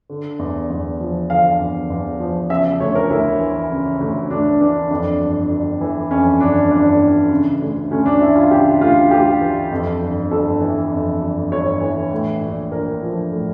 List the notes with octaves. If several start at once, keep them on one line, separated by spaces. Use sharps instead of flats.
D3
E2
E2
F3
D3 F5
E2
E2
F3
C#3 E5
D2 C#5
A#4
D2 E4
E3
C#3
D2
D2 D4
E3 D4
F2 D4
G1
G1
E3
F2 C#4
G1 D4
G1 D4
E3
C#3
D2
D2 C#4
D4
E3 E4
F4
C#3 G4
D2 F4
D2 G4
E3
F2
G1
G1 A4
E3
F2
G1
G1 C#5
E3
A2
A#1
A#1 A#4
F3
A2